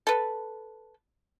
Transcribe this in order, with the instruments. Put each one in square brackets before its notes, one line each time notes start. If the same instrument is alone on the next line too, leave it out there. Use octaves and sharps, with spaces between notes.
[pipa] A4 B4